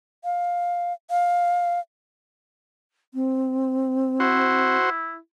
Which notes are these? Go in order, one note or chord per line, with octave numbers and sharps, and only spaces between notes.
F5
F5
C4
E4 F#4 C5